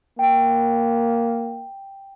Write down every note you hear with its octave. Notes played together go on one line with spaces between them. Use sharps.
A#3 G5